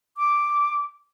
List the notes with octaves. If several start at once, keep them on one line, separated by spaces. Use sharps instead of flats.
D6